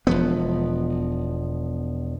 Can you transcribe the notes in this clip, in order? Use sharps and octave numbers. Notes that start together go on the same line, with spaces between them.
E1 F3 B3